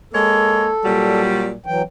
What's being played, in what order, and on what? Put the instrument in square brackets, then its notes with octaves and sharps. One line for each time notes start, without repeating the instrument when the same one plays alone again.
[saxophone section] G#3 A#3 C#5 [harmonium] A4
[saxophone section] A#2 F#3 G3
[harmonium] E3 F#3 G5